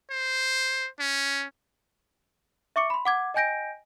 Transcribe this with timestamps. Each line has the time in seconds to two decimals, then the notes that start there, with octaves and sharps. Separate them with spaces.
0.10 C5
0.99 C#4
2.76 E5 C#6 D6 C#7
2.90 B5 C6
3.05 F#5 D6 G#6
3.34 D#5 G5 G#5 G6 A#6 D7